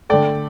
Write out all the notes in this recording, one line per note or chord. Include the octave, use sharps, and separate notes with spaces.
D3 A3 D5 G5